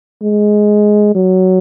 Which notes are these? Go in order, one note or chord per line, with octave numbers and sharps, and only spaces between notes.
G#3
F#3